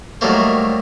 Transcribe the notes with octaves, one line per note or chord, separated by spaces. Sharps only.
D#3 F#3 G3 A3 A#3 C5